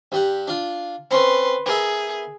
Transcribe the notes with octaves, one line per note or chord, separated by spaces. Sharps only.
G2 G4 F#5
D4 F4
C4 C#4 B4 C6
B3 G#4 A#4 E5